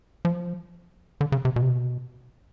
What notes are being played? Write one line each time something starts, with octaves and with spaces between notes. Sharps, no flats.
F3
D3
C#3
C3
B2
C3
B2